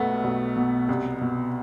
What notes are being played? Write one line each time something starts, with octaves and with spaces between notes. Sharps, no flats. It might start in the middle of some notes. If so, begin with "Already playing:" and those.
Already playing: B1 B2 A3 B3
B1
B2
C2
B2